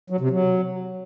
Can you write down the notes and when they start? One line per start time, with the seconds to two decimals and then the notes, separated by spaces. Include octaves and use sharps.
0.10 F#3
0.20 C3
0.31 F#3